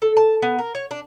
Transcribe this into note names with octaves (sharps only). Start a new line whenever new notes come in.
A4
A5
B3
A#4
C#5
D4